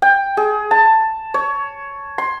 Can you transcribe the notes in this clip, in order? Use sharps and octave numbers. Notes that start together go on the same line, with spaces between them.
G5
G#4
A5
C#5
C6